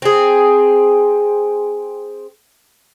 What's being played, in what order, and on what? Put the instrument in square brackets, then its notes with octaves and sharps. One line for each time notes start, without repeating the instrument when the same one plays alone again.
[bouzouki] C4 G#4